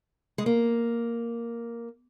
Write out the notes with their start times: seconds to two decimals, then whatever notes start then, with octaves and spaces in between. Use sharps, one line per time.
0.38 G#3
0.46 A#3